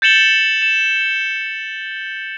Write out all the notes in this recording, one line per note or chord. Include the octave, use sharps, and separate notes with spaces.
G6 A6 C#7 E7 F#7 G7
E7